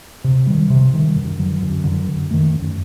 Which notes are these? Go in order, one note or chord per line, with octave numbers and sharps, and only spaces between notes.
C3
D#3 G3
C3
D#3 G3
F#2
D3 F#3
F#2
D3 F#3
F#2
D#3 A3
F#2